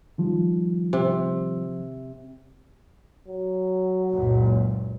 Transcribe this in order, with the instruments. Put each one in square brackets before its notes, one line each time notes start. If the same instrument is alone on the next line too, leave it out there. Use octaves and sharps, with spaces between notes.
[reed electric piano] D#3 F3 G3
[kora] C3
[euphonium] F#3
[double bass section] F#1 C#2 A#2